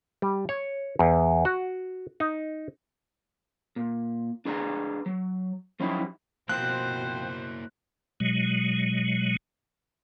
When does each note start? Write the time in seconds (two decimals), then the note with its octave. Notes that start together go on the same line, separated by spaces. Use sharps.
0.22 G3
0.49 C#5
0.99 E2
1.45 F#4
2.20 D#4
3.76 A#2
4.45 D4 G#4 B4 D5 E5 A#5
5.06 F#3
5.80 F3 F#3 C#4 D#4 E4 G4
6.49 B2 F3 A#3 C4 E4 A#4 C5 F#6
8.20 B2 F#3 G#3